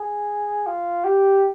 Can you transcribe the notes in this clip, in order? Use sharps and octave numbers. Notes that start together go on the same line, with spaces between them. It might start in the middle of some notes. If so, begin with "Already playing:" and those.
Already playing: G#4
F4
G4